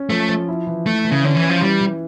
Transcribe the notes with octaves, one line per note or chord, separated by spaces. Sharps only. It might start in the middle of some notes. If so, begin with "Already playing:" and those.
Already playing: C#4
F3 A3
F3
E4
E3
A3 E4
E3
C#3
D3 C#4
E3
C#4
F3
E3 G3
E3